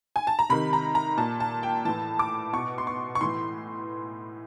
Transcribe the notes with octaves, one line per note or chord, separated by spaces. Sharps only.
G#5
A5
A#5
C3 D#3 B5
A#5
A#5
A#2 A5
A5
G5
A2 E3 A5
D6
B2 C#6
C6
C#6
C#6
A2 E3 C6